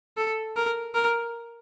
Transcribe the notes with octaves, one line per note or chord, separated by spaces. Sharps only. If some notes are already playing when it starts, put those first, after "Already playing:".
A4
A#4
A#4